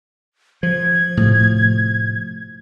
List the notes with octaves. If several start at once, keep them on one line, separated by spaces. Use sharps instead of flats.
F3 G#6
A2 C3 F3